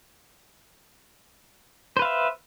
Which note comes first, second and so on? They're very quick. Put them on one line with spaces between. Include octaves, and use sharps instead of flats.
C5 B4 F5 E5